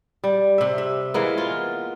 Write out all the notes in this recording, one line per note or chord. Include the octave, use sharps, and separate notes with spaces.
G3
C3 E5
E5
E3 G#3 A#3 B3
F4